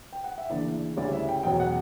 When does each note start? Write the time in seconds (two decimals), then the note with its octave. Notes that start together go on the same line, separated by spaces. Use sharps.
0.13 G5
0.24 F#5
0.38 E5
0.49 D2 C#3 E3 A#3 D4 D5
0.96 D2 C#3 G3 C#4 E4 D5
1.13 E5
1.29 G5
1.43 E2 B2 F#3 C#4 G5
1.60 F#5